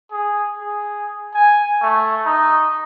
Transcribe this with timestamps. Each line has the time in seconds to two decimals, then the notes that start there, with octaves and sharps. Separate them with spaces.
0.12 G#4
0.61 G#4
1.34 G#5
1.82 A3
2.26 D#4